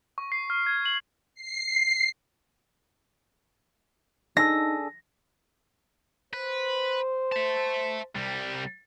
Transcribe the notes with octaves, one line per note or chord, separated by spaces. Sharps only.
C#6
C7
F6
G#6
F#7
C7
D4 D#4 G#4 A4 A#6
B4 C5
E5 A5
C2 G3